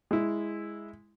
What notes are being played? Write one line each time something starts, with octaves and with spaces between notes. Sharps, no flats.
G#3 E4